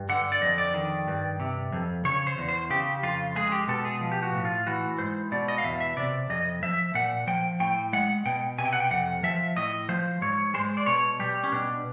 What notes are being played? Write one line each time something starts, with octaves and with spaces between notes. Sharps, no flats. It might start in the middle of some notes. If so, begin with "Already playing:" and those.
Already playing: G2
D3 F#5
D5
F2 D#5
D5
D#3
G2
C3
F2
C#3 C#5
C5
E2
C5
C#3 G4
F2 F4
G#3 G#4
G4
B2 A4
G#4
F3
G4
F#4
A2
F4
E3 F#4
G#2 C5
B2 D5
D#5
F5
E2 E5
E5
C3 D5
F2 D#5
F3 E5
A#2 F#5
F3 G5
A2 G5
G#3 F#5
B2 G5
C3 G#5
G5
F#5
G5
F2 F#5
F3 E5
A2 D#5
F3 C5
G#2 C#5
G#3 C5
D5
B2 C#5
G3 G4
C#4
B2 D4